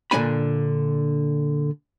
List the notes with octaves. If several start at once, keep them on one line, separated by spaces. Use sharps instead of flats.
A#2 D3 G#3 D4 G#5 B5